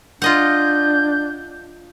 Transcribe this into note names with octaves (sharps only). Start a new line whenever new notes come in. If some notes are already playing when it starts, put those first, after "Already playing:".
D4 F4 D#5 F#5 G6